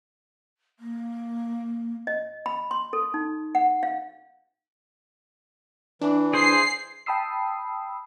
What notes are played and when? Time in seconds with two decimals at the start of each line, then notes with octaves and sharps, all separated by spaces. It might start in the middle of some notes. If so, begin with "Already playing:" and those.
0.79 A#3
2.07 D#5
2.46 B5
2.71 C6
2.93 A4
3.14 D#4
3.55 F#5
3.83 F5
6.01 E3 D4
6.33 G#4 C5 C7
7.06 G5 A5 B5 D#6 E6 C7